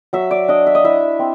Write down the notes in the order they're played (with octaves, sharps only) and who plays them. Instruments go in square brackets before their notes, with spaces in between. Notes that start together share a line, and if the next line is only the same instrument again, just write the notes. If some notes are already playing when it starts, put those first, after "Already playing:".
[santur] F#3 E5
D5
D4 D#5
E5
D#5
E4 E5
C4